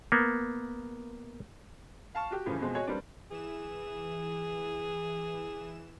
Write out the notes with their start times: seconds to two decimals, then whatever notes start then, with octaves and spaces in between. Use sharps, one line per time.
0.12 A#3 B3
2.15 F5 A5 C#6
2.31 F#4 G4
2.46 F#2 A2 C#3 E3 F3
2.59 F2 B2 F3 G#3 C4
2.74 F#4 G#4 C#5 D#5
2.87 G3 A#3 C4 D4 B4 D5
3.31 E3 G#4 E7